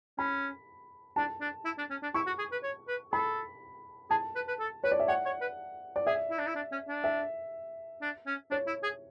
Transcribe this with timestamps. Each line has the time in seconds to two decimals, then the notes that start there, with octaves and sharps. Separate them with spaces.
0.18 C#4 B5
1.16 D4 A5
1.41 D4
1.65 E4
1.78 D4
1.90 C#4
2.02 D4
2.14 E4 C#6
2.27 F#4
2.38 G#4
2.52 B4
2.63 C#5
2.88 B4
3.12 A4 B5
4.10 G#4 A5
4.35 B4
4.48 B4
4.59 A4
4.84 B4 C#5
4.92 D5
5.00 E5
5.08 C#5 F#5
5.25 C#5
5.41 B4
5.96 D5
6.06 G#4 E5
6.30 E4
6.39 D4
6.47 E4
6.55 D4
6.72 C#4
6.88 D4
7.04 E5
8.02 D4
8.27 C#4
8.51 D4 C#5
8.67 E4
8.83 G#4